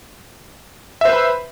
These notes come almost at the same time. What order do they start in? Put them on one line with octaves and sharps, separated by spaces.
E5 C5 B4 B5